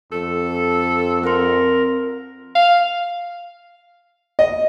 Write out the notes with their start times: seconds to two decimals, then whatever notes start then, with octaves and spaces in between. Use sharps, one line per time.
0.12 F2 A4
1.23 C4 A#4 C6
2.55 F5
4.39 D#5